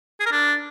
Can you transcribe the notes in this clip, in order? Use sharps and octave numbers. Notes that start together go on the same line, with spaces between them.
G#4
A#4
D4